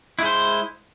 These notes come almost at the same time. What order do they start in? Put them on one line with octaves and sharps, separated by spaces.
E4 G#3 C5